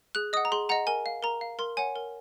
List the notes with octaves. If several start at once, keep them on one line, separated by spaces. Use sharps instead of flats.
G#4 F#6
D#5 F#5 D#6
A#5
G#4 C6
D#5 F#5 A#5
A#4 G#5
F5
A#4 A#5
F5
A#4 C6
C#5 F#5 G#5
A#4